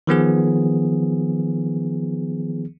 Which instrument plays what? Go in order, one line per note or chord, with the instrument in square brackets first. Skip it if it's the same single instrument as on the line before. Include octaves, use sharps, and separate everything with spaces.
[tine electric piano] D#3 F3 B3 G#4